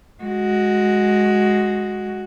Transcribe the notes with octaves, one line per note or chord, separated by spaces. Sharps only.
G#3 F#4